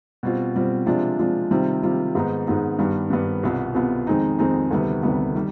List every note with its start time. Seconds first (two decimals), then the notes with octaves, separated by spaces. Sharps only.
0.23 B2 G3 C4 F4
0.54 B2 G3 C4 F4
0.86 C3 F3 G#3 D4 F4
1.19 C3 F3 G#3 D4 F4
1.51 C3 D#3 G3 C4 F4
1.83 C3 D#3 G3 C4 F4
2.15 G#2 D#3 B3 D#4
2.47 G#2 D#3 B3 D#4
2.79 G2 D#3 G3 B3
3.10 G2 D#3 G3 B3
3.43 C2 B2 B3 F4
3.75 C2 B2 B3 F4
4.07 F2 D#3 G#3 C4 D#4
4.39 F2 D#3 G#3 C4 D#4
4.71 D2 C3 D#3 G3 B3
5.03 D2 C3 D#3 G3 B3
5.35 D#3 G3